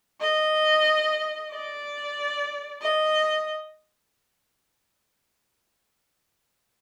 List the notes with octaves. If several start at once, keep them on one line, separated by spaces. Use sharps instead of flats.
D#5
D5
D#5